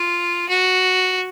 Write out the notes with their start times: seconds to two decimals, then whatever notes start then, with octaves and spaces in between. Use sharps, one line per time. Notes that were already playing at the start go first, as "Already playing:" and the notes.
Already playing: F4
0.49 F#4